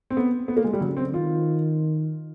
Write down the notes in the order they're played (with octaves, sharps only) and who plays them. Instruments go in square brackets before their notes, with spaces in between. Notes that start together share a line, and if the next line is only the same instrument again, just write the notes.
[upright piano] C4
B3
B3
A#3
G#3
G3
[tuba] C#3 [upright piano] F#3
[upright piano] C4
[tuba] D#3 [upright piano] F4